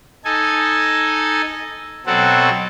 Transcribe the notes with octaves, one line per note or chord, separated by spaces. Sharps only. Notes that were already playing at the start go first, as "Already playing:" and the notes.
D#4 A4 G#5
B2 F#3 C4 F#4 A4